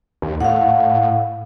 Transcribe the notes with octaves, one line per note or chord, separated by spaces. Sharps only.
D#2
A2 F5 F#5